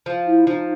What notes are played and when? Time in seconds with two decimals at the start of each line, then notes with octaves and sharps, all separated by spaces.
0.06 F3
0.27 E4
0.47 F3 D#4